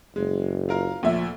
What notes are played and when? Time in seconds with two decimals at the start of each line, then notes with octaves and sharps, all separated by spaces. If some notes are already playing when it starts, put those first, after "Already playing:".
0.16 F#1 G#3
0.69 F4 A#4 F5
1.03 D2 A#2 F3 E5